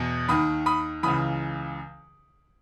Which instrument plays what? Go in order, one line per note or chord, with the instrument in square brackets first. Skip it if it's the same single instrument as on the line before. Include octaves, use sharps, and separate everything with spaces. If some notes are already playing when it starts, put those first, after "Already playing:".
Already playing: [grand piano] E2 B2
D#2 D#3 B5 D#6
B5 D#6
C#2 C#3 E3 B5 D#6